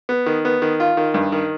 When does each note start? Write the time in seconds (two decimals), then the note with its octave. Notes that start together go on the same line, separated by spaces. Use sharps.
0.09 B3
0.26 D#3
0.45 B3
0.62 D#3
0.80 F4
0.97 D#3
1.14 G2
1.32 D#3